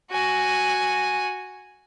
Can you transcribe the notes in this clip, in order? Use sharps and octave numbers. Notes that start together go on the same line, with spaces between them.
F#4 G#5